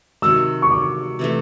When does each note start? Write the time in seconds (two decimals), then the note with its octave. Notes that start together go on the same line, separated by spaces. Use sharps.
0.22 C3 D#3 F#3 E6
0.62 C#6
0.71 D6
1.19 C3 E3 A3